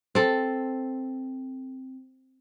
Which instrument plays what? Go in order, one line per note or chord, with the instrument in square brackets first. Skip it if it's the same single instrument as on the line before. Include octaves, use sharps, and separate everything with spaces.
[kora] C4 A4